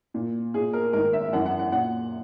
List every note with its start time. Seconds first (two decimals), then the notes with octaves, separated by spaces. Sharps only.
0.14 A#2
0.54 A#2 G#4
0.73 A#4
0.93 G#2 D#3 A#4
1.13 E5
1.25 E5
1.33 F#2 E3 F#5
1.46 F#5
1.59 F#5
1.72 A#2 F#5